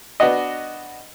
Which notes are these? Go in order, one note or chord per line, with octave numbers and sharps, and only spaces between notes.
B3 D4 F#4 D#5